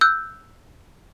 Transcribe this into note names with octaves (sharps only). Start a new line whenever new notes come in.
E6 F#6 G6